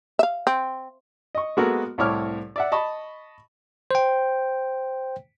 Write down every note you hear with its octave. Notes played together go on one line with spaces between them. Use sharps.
E5 F5
C4
D#5 C#6
G#3 A#3 B3 F#4 A4 A#4
C2 A2 E4 C#5 D6 F6
D5 E5 F#5
D#5 A5 B5 C#6
C5 G5